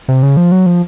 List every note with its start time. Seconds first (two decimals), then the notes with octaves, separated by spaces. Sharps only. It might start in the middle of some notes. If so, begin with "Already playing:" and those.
0.08 C3
0.23 C#3
0.37 F3
0.52 F#3
0.66 F3